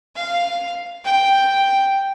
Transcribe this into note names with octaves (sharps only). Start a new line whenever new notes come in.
F5
G5